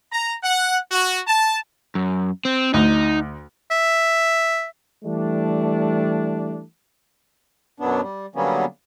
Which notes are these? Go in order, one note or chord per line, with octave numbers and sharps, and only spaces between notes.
A#5
F#5
F#4
A5
F#2
C4
D2 D#4
E5
E3 G3 A3 D4
F#2 B2 F#3 B3 D4
G3
D3 F#3 G3 A#3 B3 C#4